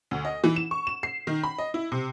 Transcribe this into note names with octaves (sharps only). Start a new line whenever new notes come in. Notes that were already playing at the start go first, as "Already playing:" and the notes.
D2
D#5
E3
E7
C#6
E7
C7
D#3
B5
D#5
E4
C3